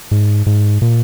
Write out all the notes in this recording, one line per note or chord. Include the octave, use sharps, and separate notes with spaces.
G#2
G#2
A#2